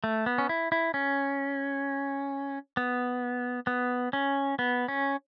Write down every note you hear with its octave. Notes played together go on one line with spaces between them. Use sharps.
A3
B3
C#4
E4
E4
C#4
B3
B3
C#4
B3
C#4